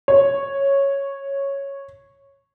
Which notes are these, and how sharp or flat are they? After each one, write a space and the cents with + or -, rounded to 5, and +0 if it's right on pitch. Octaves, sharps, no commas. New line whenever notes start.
C#5 -5